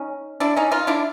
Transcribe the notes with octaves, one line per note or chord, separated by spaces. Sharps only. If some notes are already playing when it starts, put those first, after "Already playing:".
Already playing: C#4 D#4
D4 E4
C#4 D#4
D#4 F4
D4 E4